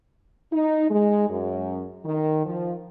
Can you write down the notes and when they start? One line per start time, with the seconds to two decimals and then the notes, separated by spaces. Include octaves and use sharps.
0.51 D#4
0.90 G#3
1.29 F#2
2.04 D#3
2.45 F3